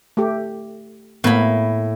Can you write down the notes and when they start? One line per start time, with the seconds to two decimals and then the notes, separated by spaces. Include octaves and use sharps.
0.17 A3 G4
1.24 A2 A#3 B3 B5